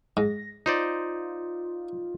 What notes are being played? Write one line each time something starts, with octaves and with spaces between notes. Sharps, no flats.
G#2 A#6
D#4 F4 C5 D5